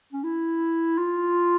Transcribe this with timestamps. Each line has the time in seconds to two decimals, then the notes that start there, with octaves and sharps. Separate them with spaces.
0.13 C#4
0.24 E4
0.98 F4